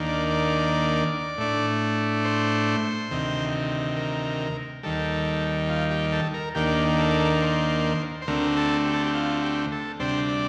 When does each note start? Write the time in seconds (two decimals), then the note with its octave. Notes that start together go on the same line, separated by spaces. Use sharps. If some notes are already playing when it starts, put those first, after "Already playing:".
Already playing: D#2 D#3 A#3 D4
0.09 D5
0.30 D5
1.38 A2 A3 D4
2.25 C5
3.11 D2 C3 D#3
3.97 A#4
4.83 D#2 D#3 G3 A4
5.69 F4
5.91 G4
6.13 A4
6.34 A#4
6.55 D#2 D#3 A#3 D4 G4
6.99 A4
7.42 C5
8.22 C5
8.28 D2 D3 A3 C4 A#4
8.57 A4
8.86 G4
8.94 A4
9.03 G4
9.14 F4
9.42 G4
9.72 A4
9.99 D2 C3 G3 D4 C5
10.28 D5